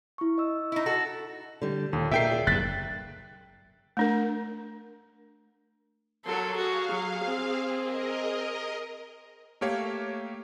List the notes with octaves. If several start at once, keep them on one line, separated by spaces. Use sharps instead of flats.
E4 C#6
D#5 E6
D#4 E4
F#4 A4
D3 G3
D#2 A#2
A#2 D#4 G#4 A#4 E5 G5 C7
G#4 D5
F#1 G2 F#6 A6 B6
A3 D4 A#4
F#3 A4 A#4 C6
F#4 G#4 F5
F#3
C4
A#4 D#5
A3 A#3 G4 C#5 F5